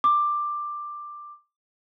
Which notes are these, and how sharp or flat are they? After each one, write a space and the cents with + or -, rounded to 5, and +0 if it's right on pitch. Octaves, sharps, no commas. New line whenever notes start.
D6 +10